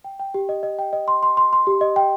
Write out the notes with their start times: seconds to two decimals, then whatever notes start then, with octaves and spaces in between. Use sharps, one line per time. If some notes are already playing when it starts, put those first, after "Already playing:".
0.04 G5
0.19 G5
0.34 G4
0.49 D#5
0.63 D#5
0.79 G5
0.93 D#5
1.08 C6
1.23 C6
1.37 C6
1.53 C6
1.67 G4
1.81 D#5
1.96 G5